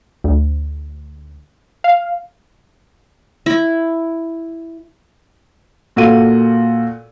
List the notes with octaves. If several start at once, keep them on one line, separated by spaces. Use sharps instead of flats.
D2
F5
E4
A#2 F#4 A4 F5 D#7